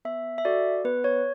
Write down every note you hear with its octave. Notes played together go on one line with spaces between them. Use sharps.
B3 E5
E5
F#4 A4 D5
B3 B4
C#5